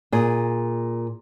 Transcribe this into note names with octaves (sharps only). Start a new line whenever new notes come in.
A#2 G#4